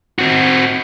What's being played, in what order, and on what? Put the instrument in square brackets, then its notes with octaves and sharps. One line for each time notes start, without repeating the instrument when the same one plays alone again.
[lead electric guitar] C4 F#4